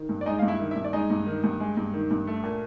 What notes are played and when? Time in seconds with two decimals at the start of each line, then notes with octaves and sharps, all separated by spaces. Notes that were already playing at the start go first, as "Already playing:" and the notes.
Already playing: D#3
0.09 G2
0.21 D5
0.26 G#3 D#4 D#5
0.39 G2 F5
0.48 E4 E5
0.59 D#3
0.71 E4 E5
0.76 G2
0.84 D5
0.93 G#3 D#4 D#5
1.10 G2
1.27 D#3
1.44 G2
1.60 G#3
1.77 G2
1.93 D#3
2.11 G2
2.27 A3
2.43 A#2